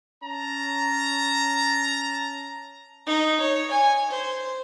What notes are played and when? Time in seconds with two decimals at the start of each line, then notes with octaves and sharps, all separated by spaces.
0.22 C#4 A5 A#5
3.07 D#4
3.41 C#5
3.71 G#5
4.11 C5